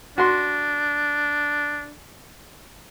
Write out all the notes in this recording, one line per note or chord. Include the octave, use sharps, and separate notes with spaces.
D4 F#4 C6